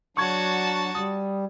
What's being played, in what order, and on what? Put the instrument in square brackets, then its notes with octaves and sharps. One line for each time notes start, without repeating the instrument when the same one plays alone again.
[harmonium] F#3 D4 [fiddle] F#4 A5 [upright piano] C#6 G#6
[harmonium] G3 [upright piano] D#6